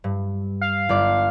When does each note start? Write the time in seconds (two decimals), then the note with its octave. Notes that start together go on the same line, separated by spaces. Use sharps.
0.04 G2
0.61 F5
0.89 G1 D5 D6